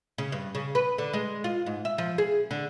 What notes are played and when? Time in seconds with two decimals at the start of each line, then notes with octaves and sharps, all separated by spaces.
0.18 C#3
0.32 G2
0.55 C#3
0.75 B4
0.98 D3
1.13 G#3
1.44 F4
1.66 G#2
1.85 E5
1.98 F3
2.18 G#4
2.51 D3